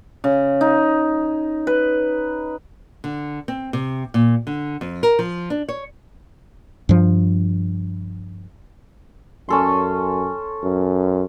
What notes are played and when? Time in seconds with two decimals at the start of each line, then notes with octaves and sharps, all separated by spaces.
0.24 C#3
0.61 D#4
1.67 B4
3.04 D3
3.48 C4
3.73 C3
4.14 A#2
4.47 D3
4.81 F2
5.03 A#4
5.19 F3
5.50 D4
5.69 C#5
6.89 G2 F3
9.49 F#2 C#4 A4 C6
10.63 F#2